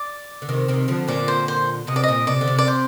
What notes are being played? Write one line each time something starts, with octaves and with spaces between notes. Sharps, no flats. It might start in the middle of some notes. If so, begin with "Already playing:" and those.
Already playing: D5
D3
C3 D#3
C3 D#3
D3 F3
A#2 D3 D5
C5
C5
C3 D#5
D5
A#2 D#5
C3 D5
D3
C3
D5
C5